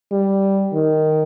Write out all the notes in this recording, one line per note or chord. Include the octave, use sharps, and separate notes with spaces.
G3
D#3